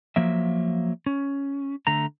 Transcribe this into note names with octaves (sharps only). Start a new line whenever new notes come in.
F3 F#3 A#3 E5
C#4
D3 A3 A#5